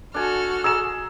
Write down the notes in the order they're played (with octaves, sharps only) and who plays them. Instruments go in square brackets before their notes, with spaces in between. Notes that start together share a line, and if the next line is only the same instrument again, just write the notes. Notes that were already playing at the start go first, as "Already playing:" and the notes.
[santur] D4 G#5 [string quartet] F#4 A4 F6
[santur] G#4 A#5 D#6 [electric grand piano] E6 E7